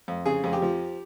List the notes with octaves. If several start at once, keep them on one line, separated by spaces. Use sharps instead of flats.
F2
C#3 G#4
F2 G#4
G4
F3